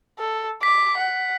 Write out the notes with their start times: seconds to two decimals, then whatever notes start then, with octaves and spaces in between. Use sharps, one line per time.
0.19 A4
0.63 D6 B6
0.98 F#5